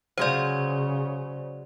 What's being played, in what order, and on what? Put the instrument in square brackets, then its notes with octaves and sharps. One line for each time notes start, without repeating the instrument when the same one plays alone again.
[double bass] C#3 [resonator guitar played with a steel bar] F#3 G#3 F4 [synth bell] C5 D5